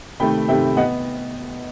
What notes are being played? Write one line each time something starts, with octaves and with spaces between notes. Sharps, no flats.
C3 D#3 A3 G5 B5
C3 D#3 A3 E5 G5
B3 D#5 F#5